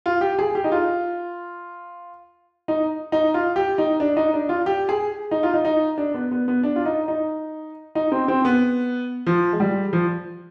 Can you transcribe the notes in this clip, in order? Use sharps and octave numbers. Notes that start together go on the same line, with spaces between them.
F4
G4
G#4
G4
D#4
F4
D#4
D#4
F4
G4
D#4
D4
D#4
D4
F4
G4
G#4
D#4
F4
D#4
D#4
D4
B3
B3
B3
D4
F4
D#4
D#4
D#4
C4
C4
B3
F3
G#3
G3
F3